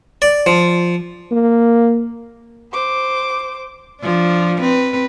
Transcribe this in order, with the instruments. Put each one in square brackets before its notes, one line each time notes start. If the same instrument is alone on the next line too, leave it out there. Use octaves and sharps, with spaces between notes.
[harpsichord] D5
F3
[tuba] A#3
[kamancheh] C5 D6
[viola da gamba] F3 D4
C4 B4